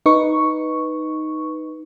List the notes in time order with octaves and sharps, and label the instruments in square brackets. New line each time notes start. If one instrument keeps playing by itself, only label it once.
[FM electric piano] D#4 B4 C#6